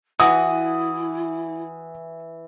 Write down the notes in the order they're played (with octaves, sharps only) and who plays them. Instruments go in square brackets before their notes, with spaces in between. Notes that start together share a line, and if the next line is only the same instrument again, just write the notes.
[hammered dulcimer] E3 [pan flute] E4 [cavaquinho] F#4 [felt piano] D#6